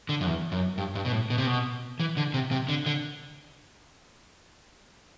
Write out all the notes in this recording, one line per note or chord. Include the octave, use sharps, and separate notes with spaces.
D3
F#2
E2
F#2
G2
G2
B2
A2
B2
C3
B2
E3
D3
C3
C3
D3
D3